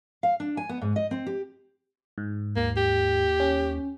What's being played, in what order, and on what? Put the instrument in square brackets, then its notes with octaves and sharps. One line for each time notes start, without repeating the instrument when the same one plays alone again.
[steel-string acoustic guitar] F5
D4
G#5
B3
G#2
D#5
C4
G4
[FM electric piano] G#2
[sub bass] D#2 [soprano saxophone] A#3
[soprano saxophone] G4
[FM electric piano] C#4